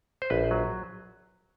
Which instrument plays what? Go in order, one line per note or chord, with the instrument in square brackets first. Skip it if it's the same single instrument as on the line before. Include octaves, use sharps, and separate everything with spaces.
[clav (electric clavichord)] C5
A#1 B4
F#3